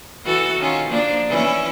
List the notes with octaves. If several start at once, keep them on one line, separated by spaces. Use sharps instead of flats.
E3 F#4 A4
D#3 C#4 F4
F3 A#3 D4
E3 C#4 E4